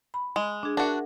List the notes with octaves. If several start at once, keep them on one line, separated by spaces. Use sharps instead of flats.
B5
G#3
D4 G#4
D4 F#4 A#4 E5 F#5